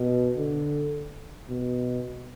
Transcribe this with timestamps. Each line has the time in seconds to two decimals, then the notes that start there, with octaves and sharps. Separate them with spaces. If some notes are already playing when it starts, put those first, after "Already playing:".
Already playing: B2
0.36 D3
1.49 B2